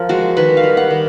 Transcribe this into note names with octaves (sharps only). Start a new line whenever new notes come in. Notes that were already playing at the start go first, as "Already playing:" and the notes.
Already playing: F3 A#4
G#3 F#4
D#3 B4
F5
G3
F#5
D#3